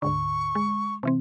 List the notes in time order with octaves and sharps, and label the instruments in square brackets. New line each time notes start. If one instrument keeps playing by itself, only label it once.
[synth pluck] D2 G#2 D3 [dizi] C#6
[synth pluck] G#3
C3 E3 C4